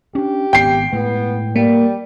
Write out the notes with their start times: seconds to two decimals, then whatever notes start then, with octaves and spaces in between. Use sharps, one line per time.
0.15 C#4 D4 G4
0.53 G#1 B3 G5 C7
0.93 A2 G#3 B3
1.56 G3 A#3